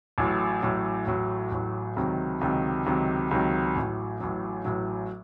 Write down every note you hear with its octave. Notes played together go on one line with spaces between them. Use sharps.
A1 A2 F#3
A1 A2 F#3
A1 A2 F#3
A1 A2 F#3
C#2 C3 D#3 F#3
C#2 C3 D#3 F#3
C#2 C3 D#3 F#3
C#2 C3 D#3 F#3
A1 A2 F#3
A1 A2 F#3
A1 A2 F#3